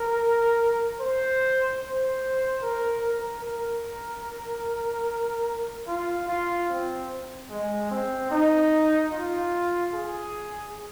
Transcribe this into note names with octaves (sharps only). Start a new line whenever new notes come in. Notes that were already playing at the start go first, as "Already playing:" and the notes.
Already playing: A#4
C5
C5
A#4
A#4
A#4
F4
F4
C4
G#3
C4
D#4
F4
G#4